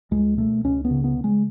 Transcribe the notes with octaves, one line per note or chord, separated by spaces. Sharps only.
C#2 G#3
B2 A3
C#2 C#4
B3
C#3
B3
C#3
G#3